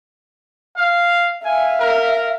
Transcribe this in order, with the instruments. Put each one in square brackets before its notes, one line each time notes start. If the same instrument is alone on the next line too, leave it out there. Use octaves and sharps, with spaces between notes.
[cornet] F5
[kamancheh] E5 F5 [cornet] G#5
[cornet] A#4